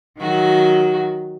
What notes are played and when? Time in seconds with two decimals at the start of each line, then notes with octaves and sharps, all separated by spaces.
0.19 D#3 F#3 F#4